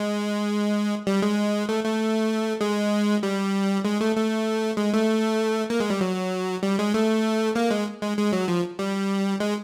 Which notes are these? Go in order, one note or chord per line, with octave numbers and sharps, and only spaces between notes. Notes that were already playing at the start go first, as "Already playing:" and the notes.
Already playing: G#3
G3
G#3
A3
A3
G#3
G3
G#3
A3
A3
G#3
A3
A#3
G#3
G3
F#3
G3
G#3
A3
A#3
G#3
G#3
G#3
F#3
F3
G3
G#3